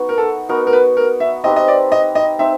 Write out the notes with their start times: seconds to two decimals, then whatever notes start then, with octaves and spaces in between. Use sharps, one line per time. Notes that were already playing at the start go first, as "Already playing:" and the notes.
Already playing: B3 D#4 F#4
0.09 A#4
0.18 A4
0.49 B3 D#4 F#4 A#4
0.67 A#4
0.73 B4
0.97 A#4
1.20 E5
1.44 C4 D#4 G4 B4 D#5
1.56 D#5
1.68 D5
1.92 D#5
2.15 D#5
2.39 C4 D#4 E5